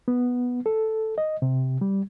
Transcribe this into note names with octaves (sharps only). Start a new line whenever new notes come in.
B3
A4
D#5
C3
G3